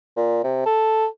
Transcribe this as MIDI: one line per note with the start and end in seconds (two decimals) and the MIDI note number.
0.17 0.42 46
0.44 0.62 48
0.66 1.07 69